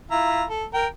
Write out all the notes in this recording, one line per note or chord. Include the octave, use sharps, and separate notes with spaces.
E4 F4 A#5
A4
A#4 G5